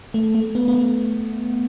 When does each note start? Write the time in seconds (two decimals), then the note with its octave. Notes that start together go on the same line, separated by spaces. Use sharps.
0.14 A3
0.35 A3
0.55 B3
0.68 B3
0.74 A3